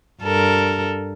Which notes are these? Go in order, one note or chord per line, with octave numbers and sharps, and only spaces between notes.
G2 A4 A#4